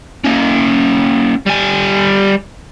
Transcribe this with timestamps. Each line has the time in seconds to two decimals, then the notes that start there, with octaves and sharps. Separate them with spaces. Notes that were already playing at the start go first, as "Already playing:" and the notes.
0.24 A#3 C#4
1.46 G3 G#5